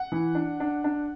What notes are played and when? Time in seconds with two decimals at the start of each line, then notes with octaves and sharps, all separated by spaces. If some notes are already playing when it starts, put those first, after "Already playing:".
Already playing: F#5
0.12 E3
0.35 D4
0.60 D4
0.84 D4